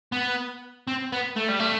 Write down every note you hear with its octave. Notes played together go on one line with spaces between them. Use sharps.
B3
C4
B3
A3
G3
A3